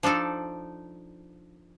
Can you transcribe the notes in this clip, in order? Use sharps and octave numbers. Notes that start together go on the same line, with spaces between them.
F3 D4 D#4 A4 D5